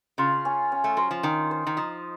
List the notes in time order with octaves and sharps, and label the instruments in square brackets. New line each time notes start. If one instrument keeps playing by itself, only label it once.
[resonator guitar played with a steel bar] C#3 [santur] F4
[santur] C#4
C#4
[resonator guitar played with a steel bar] A3
[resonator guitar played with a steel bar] F#3 [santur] C5
[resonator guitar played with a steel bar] F3
[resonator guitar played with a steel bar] D#3 [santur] D#4
[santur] C5
[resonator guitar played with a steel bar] D#3
[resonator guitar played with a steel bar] F3 [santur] D#4